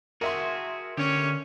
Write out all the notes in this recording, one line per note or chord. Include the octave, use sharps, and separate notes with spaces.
F#4 G#4 A#4 E5 C6
D3 C#4 G4 C#5